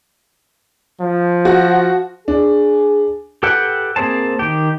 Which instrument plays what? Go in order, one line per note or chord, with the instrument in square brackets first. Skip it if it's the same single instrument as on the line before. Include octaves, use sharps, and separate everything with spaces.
[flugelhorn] F3
[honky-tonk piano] F#4
[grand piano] D4 [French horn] G#4
[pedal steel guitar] G4 A4 B4 F#5 G5
A#3 C4 G#4 C5 A5
D#3 G4